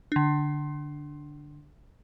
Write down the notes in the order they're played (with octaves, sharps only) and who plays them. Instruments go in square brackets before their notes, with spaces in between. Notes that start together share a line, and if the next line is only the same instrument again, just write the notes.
[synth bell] D3 D4